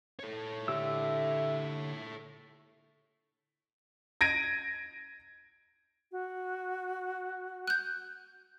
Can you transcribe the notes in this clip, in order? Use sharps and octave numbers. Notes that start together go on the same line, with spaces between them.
A4 C#5
D3 G4 E5 E6
G#6 A#6 D7 D#7
F#4
F#6 G6